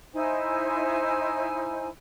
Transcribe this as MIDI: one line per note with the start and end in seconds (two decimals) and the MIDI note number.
0.14 1.88 63
0.14 1.88 64
0.14 1.88 72
0.14 1.88 80